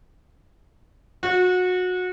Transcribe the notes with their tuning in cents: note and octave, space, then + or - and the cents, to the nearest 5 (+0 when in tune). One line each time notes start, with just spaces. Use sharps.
F#4 -25